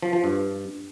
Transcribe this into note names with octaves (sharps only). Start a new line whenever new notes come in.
F3
F3
G2